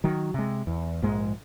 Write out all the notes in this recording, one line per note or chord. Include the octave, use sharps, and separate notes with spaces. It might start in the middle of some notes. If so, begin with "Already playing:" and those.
D#3 F#3
C3 G#3
E2
A#1 G#2 G#3